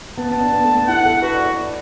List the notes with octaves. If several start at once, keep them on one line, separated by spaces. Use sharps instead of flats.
B3 A5
B3
D4
B3
A3
B3
E4 F#5
A4
F#4 B4
D5
D5
D5